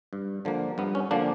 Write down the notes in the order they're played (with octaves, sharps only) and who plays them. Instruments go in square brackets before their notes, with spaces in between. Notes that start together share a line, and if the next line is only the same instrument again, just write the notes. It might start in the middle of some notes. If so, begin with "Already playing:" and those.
[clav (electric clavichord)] G2
D3 F3 A#3
G2 B3
C#4
D3 F3 A#3 D4